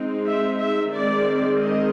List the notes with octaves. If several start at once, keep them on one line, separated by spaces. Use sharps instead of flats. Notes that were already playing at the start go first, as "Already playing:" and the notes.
Already playing: G#3 C4 D#4
E5
E5
D#3 G#3 C4 D5
D#5